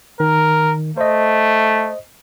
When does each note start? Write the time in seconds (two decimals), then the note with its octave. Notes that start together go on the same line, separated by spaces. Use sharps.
0.20 D#3 A#4
0.97 A3 C5 D#5